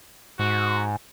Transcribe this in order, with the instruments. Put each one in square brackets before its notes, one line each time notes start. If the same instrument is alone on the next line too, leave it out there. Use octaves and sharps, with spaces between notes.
[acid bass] G#2 [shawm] F#4